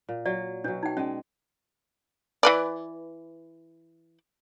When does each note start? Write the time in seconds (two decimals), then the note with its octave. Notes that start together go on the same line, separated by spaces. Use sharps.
0.09 A#2
0.26 F#3 D5
0.64 B2 F#3 D4
0.83 D#4 G5
0.97 G#3 C#4 D5
2.43 E3 B4 D5